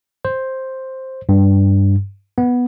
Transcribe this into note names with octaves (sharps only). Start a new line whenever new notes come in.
C5
G2
B3